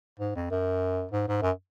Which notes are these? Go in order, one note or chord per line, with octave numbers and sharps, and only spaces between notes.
G#2
F2
F#2
G#2
G#2
F#2